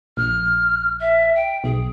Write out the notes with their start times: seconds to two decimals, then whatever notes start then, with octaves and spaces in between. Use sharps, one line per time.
0.17 A#1 F6
1.00 E5
1.35 G5
1.64 B1 G#4